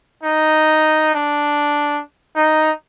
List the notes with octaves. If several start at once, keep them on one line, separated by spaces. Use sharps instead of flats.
D#4
D4
D#4